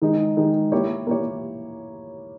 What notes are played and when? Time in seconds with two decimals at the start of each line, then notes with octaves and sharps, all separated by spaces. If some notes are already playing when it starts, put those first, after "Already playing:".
0.02 D#3 G#3 D#4
0.37 D#3 G#3 D#4
0.72 A#3 E4 G4 C#5
1.07 A#3 E4 G4 C#5